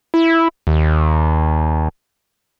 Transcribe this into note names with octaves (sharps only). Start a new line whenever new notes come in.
E4
D#2